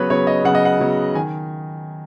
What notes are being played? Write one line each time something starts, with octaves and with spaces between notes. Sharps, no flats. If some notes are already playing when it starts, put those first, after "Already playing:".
Already playing: C#3 F#3 B3 B4 C#5
C#3 F#3 B3 C#5
D#5
C#3 F#3 B3 F#5
D#5
F#5
C#3 F#3 B3
D#3 G#5